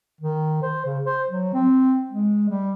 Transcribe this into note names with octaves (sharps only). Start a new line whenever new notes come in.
D#3
C5
C#3
C5
F#3
C4
G#3
G3